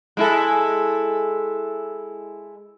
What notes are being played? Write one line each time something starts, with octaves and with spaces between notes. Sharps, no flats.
G#3 E4 A4